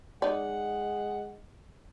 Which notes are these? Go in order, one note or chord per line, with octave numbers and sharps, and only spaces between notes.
G#3 D#4 D5 F#5